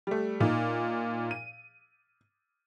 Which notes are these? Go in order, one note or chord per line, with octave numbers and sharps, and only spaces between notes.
G3 A3
A#2 D#4
D#7